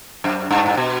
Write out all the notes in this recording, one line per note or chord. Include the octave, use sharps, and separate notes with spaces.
F#2
G2
A2
B2